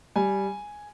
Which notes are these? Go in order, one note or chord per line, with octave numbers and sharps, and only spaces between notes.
G3 G#5